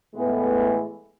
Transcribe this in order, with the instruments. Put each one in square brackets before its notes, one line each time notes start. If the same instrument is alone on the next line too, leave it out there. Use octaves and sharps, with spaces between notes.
[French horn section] A2 E3 G#3 A3 B3